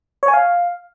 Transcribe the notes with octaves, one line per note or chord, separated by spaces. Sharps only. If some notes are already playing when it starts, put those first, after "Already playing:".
C#5
G#5
F5